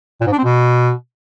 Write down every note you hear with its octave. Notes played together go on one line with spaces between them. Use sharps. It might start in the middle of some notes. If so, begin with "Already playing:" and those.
A#2
G#2
D4
C4
B2